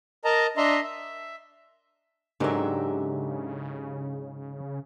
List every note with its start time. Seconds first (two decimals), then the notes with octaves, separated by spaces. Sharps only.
0.25 A#4 D#5 A5 A#5
0.57 D4 D#5 E5 A#5 C6
0.83 E5
2.40 G#2 C#3 F#3 D4 G4 A4 A#4 E5